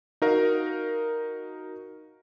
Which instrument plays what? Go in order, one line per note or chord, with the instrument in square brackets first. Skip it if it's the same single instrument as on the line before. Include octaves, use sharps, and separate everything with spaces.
[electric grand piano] D#4 F#4 A#4 F5